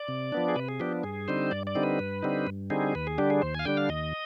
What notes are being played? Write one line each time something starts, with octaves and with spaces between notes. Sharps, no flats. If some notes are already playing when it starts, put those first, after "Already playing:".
Already playing: D5
C3
F3 B3 D4
G#4
C3 B4
G#4
F3 B3 D4 G4
G2 G#4
D3 G3 C4 D#4 C5
G2 D5
D5
D3 G3 C4 D#4
B4
G2
D3 G3 C4 D#4
G2
D3 G3 C4 D#4 G#4
D#2 B4
G#4
D3 G3 D4 G4
G#4
D#2 C5
F5 G#5
D3 G3 D4 G5
F5
D#2 D#5